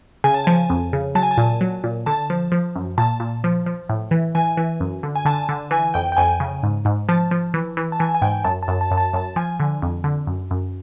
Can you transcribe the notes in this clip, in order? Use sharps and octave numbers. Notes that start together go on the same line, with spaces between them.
C#3 G#5
A5
F3 G#5
F2
C#3
F#3 A5
G#5
A5
A#2
F#3
A#2
D3 A5
F3
F3
F#2
A#2 A5
A#2
F3
F3
A2
E3
E3 G#5
E3
F#2
D3
G#5
D3 A5
D3
E3 G#5
F2 G5
G5
F2 G#5
C#3
G#2
G#2
F3 A5
F3
E3
E3
A5
E3 G#5
G#5
G#2 G5
F#2 A5
A5
F#2
A5
F#2
A5
F#2 A5
F3 G#5
D3
F2
D3
F#2
F#2